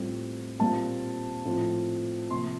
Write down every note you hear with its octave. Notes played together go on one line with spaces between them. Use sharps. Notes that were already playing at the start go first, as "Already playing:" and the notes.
Already playing: A2 G3 C4 F4
A#2 G3 C4 F4 A5
A2 F3 C4 F4
C3 F3 A#3 C6